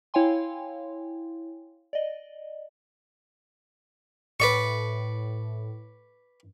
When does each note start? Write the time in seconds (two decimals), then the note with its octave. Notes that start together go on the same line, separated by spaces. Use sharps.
0.14 E4 C#5 F5 G5 G#5 C6
1.93 D5 D#5
4.40 A2 B4 D5 C#6